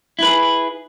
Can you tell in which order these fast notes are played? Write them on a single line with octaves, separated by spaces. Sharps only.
E4 B4 G#4